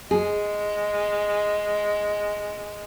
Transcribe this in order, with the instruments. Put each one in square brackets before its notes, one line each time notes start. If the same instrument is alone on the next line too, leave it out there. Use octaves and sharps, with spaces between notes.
[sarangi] G#3 [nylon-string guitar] G#4